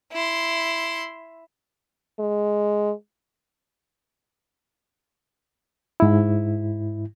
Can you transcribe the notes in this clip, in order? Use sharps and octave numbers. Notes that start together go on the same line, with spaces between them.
E4 C6
G#3
G#2 E4